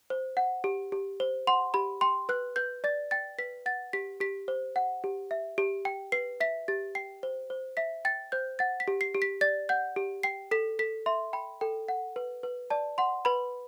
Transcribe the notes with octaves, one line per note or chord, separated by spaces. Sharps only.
C5
F#5
G4
G4
C5
F#5 C6
G4 B5
G5 C6
B4 F#6
B4 G6
D5 A6
G5 A6
B4 B6
F#5 A6
G4 B6
G4 B6
C5
F#5
G4
E5
G4
G5
B4 C7
E5 B6
G4 A6
G5 C7
C5
C5
E5 B6
G5 A6
C5 G6
F#5 A6
B6
G4
C7
G4
B6
D5 A6
F#5 G6
G4
G5 C7
A4 B6
A4 B6
E5 C6
G5 B5
A4 G5
F#5
B4
B4
D5 A5
F#5 C6
B4 B5